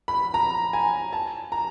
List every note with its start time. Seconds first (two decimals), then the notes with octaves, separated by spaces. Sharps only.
0.08 B5
0.34 A#5
0.73 G#5
1.13 A5
1.52 A#5